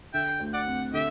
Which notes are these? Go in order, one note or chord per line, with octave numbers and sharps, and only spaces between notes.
D3 E5 G5
D2
D5 F#5
C4
D3 G4 E5